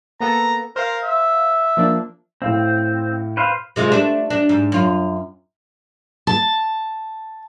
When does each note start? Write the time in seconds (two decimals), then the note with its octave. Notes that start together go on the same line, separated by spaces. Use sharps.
0.20 A#3 B3 A4 A#5
0.76 A#4 C5 F5
1.03 E5
1.77 F3 A#3 D4
2.42 A2 C4 F5
3.37 B4 C5 F5
3.76 C3 G#3 F4
3.92 A3 D4
4.30 D4
4.49 G#2
4.72 F#2 F4
6.27 A5